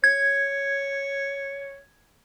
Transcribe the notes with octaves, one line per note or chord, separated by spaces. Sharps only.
C#5 G#6